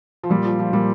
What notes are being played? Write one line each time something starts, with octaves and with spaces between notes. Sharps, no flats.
F3
A#2 G3
F3
F3
A#2 G3